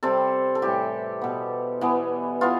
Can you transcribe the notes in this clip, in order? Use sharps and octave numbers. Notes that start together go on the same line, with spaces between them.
C3 G3 C4 A4
A4
A2 E3 G3 G4
B2 B3
E3 B3
E3 B3 F4